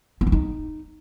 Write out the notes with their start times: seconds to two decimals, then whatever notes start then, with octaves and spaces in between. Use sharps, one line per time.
0.21 B3
0.27 D4
0.32 D#4